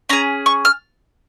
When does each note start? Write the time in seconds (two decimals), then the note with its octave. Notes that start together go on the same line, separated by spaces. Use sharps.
0.09 C#4 G#4 A#5
0.46 C#6
0.65 F6